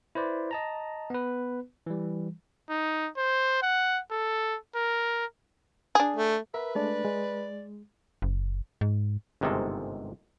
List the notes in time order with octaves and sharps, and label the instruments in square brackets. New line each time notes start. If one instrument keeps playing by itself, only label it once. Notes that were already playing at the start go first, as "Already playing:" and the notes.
[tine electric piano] E4 B4 C5 D5
D#5 A5 A#5
B3 B4
E3 G3
[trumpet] D#4
C5
F#5
A4
A#4
[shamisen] D4 G#4
[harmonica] A3
[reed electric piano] A#4 [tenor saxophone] B4 [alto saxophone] E5
[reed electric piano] G#3 A3 D4 [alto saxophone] D5
[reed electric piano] G#3
[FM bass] F#1
G#2
[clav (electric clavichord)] G1 G#2 C3 D#3 G#3 A4